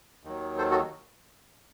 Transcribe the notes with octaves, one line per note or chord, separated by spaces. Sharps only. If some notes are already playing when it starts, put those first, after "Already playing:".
D#2 D#3 F#3
A4 C5
F#4 A4